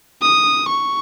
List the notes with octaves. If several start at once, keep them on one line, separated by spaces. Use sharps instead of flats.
D#6
C#6